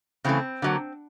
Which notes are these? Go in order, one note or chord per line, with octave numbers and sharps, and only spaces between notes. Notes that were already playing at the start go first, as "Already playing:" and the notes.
C#3 E3 A3 C4
D3 F#3 A#3